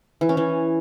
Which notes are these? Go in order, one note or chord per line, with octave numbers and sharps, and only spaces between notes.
E3
C#4
E3